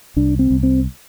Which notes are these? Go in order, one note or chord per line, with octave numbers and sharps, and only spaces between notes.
C2 D4
C4
C2
C4